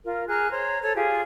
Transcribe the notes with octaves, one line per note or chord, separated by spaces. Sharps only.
F4 A#4
G#4 A#5 F6 F#6
C5 C#5 A#5
A4 C#5
F4 G4 G#4